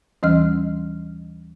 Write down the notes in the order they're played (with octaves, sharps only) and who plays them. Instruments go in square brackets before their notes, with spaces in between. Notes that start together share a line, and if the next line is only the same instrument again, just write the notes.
[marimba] D#2 E3 G3 C#4 D#5 F6